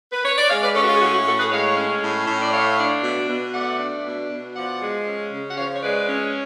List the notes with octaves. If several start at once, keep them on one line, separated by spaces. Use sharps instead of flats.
B4
C#5
D5
G#3 C#5 F5
B4 D5
C#4 A4 C#5
F#4
F4
G#4
A2 F#4
F#4
A2 F#4 A4
G#4 B4
G#3 C#5 F5
C#4
A2
A2
D5
A3 C#5 F5
D4
B2
B2
A3 D5 F#5
D4
B2
B2
F3 D5 F#5
G#3
C#4
C#3
F#5
F3 C#5 F5
C#5
G#3 B4 D5
C#4